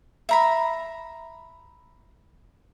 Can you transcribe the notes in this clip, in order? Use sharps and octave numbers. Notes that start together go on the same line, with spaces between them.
E5 A#5 B5